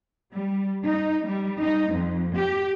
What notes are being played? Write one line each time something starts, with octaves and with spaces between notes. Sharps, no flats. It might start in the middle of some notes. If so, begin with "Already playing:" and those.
G3
D#4
G3
D#4
F2
G4